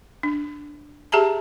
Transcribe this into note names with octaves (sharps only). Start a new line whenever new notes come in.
D4
G4 G#4 E5 A5 A#5